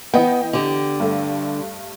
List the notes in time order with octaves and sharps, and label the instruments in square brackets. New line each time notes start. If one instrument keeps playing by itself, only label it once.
[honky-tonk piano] E3 D#5 G5 [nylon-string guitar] B3
[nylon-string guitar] D3 G4
[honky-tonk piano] G2 A3